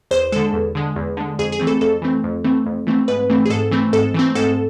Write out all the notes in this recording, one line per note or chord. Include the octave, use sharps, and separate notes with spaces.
E2 C5
D3 G#3 A4
E2
D3 G#3
E2
D3 G#3
F2 G#4
G#4
E3 A3 C4
A4
F2 A4
E3 A3 C4
F2
E3 A3 C4
F2
E3 A3 C4
G#2 B4
E3 A3 C4
G#4
G#2 A4
E3 A3 C4
G#2 A4
E3 A3 C4
G#2 A4